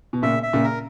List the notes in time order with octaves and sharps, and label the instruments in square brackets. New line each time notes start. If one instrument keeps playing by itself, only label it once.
[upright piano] B2
[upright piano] A#2 C#3 [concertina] E5
[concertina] E5
[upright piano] A#2 C#3
[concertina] A#4